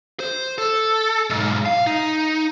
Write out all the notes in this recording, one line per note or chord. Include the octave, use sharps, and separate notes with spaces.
C5
A4
B1 G#2
F5
D#4